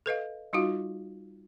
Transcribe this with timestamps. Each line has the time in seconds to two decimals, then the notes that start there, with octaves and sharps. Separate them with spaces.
0.06 A4 B4 D#5 F5
0.53 G3 D#4 F4 F#4 F5